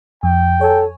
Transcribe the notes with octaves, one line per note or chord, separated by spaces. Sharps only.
F2 G5
A4 C#5 G#5